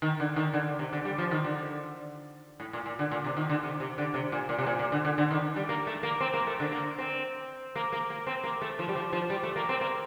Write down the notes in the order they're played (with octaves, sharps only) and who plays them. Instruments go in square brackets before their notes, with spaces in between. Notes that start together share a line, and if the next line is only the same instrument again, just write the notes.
[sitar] D#3
D3
D#3
D3
C3
D3
G3
F3
D#3
D3
A2
A#2
A#2
D3
A#2
C3
D#3
D3
C3
C3
D3
C3
A#2
A#2
C3
A#2
A#2
D3
D3
D3
D#3
G3
A#3
A3
A#3
C4
A#3
A3
D3
A#3
C4
A#3
A#3
A#3
C4
A#3
A3
F3
G3
F3
F3
G3
A3
A#3
C4
A#3